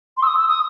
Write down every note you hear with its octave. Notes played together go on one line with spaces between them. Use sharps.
C6
E6
D#6
E6
D#6